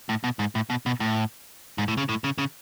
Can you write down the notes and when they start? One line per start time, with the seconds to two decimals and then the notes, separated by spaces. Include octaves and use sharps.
0.09 A2
0.24 B2
0.39 G#2
0.55 A2
0.70 B2
0.86 B2
1.00 A2
1.78 G#2
1.88 A2
1.97 C#3
2.09 A2
2.24 C#3
2.38 C#3